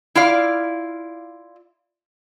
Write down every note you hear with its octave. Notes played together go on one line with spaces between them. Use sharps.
E4 F4 D5 F5